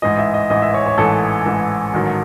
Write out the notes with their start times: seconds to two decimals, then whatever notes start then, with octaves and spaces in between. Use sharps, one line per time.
0.02 A1 G#2 E3 D#5
0.18 E5
0.34 D#5
0.50 A1 G#2 E3 D#5
0.62 E5
0.74 C#5
0.86 C#5
0.98 A1 G#2 E3 A4
1.46 A1 G#2 E3
1.94 A1 G#2 D#3 F#3